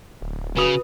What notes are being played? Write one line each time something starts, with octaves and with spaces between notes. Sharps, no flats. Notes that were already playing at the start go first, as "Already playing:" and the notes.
D1
C#3 F#4 B4 D#6